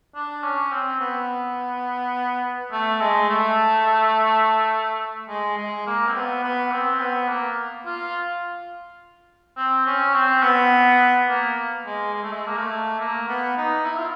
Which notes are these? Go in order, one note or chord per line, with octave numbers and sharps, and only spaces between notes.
D4
C#4
C4
B3
A3
G#3
A3
G#3
G#3
A#3
C4
B3
B3
C4
B3
A#3
F4
C4
C#4
C4
B3
A#3
G#3
G#3
A3
G#3
A#3
A3
A#3
B3
D#4
E4
F4